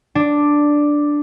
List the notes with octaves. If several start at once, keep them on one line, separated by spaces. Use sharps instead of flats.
D4